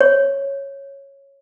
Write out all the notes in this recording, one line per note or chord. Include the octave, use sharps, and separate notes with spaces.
C#5